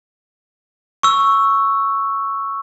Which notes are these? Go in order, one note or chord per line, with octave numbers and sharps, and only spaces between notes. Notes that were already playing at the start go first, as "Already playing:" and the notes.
C#6 E6